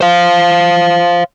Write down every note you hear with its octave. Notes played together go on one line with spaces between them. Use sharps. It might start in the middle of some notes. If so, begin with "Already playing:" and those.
C5 F5